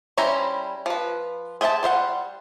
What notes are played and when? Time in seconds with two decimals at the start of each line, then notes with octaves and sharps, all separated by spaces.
0.17 G3 C#4 E4 C5 A#5
0.86 F3 B4
1.61 G#4 C5 E5 F#5 A5
1.83 G3 C5 E5 F#5